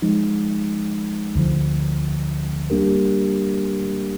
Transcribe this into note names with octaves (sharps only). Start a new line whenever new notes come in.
F3 G#3 D#4
D2 D3 F3
G3 A#3 D4 G4 A#4